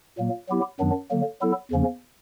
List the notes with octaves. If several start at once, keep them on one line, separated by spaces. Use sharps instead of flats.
A#2 F#3 A#3
F#3 B3 E4 G4
F#2 D#3 F#3 B3 D4
D3 F#3 A#3
F#3 B3 E4 A4
E2 C#3 F3 A#3 C#4